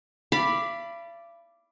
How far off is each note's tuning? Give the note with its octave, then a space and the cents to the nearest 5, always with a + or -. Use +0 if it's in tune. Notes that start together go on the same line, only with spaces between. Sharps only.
D5 +0 F5 -45 B5 +0